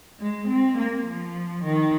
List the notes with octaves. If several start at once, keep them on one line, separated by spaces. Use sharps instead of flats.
G#3
C4
A#3
F3
D#3